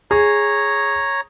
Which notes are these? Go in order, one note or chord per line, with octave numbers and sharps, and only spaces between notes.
G#4 C#5 A#5